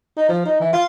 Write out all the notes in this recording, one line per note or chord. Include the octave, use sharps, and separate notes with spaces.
D#4
F3
D#4
E3
F4